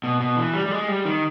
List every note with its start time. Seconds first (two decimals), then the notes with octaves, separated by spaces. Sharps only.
0.04 B2
0.20 B2
0.37 E3
0.54 G3
0.66 G3
0.71 G#3
0.88 G3
1.05 D#3